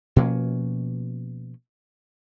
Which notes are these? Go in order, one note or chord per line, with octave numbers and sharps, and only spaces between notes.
B2 F3 A#3 C#4